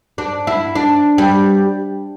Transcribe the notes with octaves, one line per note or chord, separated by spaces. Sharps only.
D4
E4
D4
G3